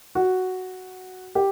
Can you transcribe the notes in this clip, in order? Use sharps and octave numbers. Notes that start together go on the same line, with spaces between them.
F#4
G4